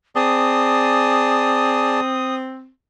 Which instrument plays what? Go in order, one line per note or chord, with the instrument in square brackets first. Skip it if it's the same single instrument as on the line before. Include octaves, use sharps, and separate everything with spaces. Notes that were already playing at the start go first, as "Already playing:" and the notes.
[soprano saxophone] C4 [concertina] G#4 D5 A5 [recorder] D#6